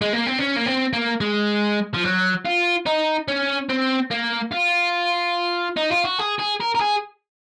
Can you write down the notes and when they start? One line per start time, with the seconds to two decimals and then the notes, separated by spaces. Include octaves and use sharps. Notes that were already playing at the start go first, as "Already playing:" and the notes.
0.01 G#3
0.13 A#3
0.26 C4
0.38 C#4
0.56 A#3
0.66 C4
0.93 A#3
1.21 G#3
1.94 F3
2.04 F#3
2.46 F4
2.86 D#4
3.28 C#4
3.70 C4
4.11 A#3
4.52 F4
5.77 D#4
5.91 F4
6.05 F#4
6.19 G#4
6.39 G#4
6.61 A#4
6.75 A#4
6.81 G#4